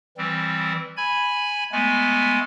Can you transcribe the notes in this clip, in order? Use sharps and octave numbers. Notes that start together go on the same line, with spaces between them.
E3 G3 C4
G#5 B5 G#6
G#3 A3 B3 G#5